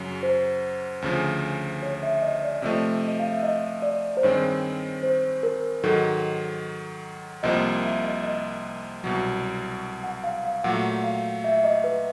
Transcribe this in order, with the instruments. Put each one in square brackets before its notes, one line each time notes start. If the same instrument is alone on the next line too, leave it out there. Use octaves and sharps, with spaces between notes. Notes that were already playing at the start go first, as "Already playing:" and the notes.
Already playing: [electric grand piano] F#2 C#3 F#3
[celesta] C5
[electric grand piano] D2 C#3 F3
[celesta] C#5
E5
D#5
D5
[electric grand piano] C3 F3 A3 [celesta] D#5
[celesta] D#5
F5
E5
D#5
D5
C5
[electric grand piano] G2 D#3 G#3 C4 [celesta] C#5
[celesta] C5
A#4
[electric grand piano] G#2 D#3 F#3 [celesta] A4
[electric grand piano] C2 C3 F3 A#3 [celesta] D#5
[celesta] E5
D#5
D#5
[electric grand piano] C2 B2 F#3
[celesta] F#5
F5
F5
[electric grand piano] A#2 F#3 A3 [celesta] F#5
[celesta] F5
E5
D#5
B4